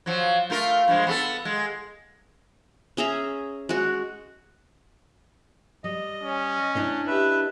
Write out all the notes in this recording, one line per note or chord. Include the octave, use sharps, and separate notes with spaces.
F3 F#3
A3 F4 A#4
G2 F3 G#3
B3 C#4 A4
G#3
C#4 G#4 E5 A#5
G#3 F#4
G3 D#5
C#4
D4 E4 D#5
G4 B4 E5